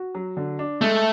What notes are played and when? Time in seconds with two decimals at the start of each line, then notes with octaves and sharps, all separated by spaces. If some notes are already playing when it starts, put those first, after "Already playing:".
Already playing: F#4
0.15 F#3
0.37 D3
0.59 D4
0.81 G#3 A3